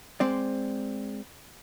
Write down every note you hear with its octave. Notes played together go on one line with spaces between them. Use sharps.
G#3 C4 D5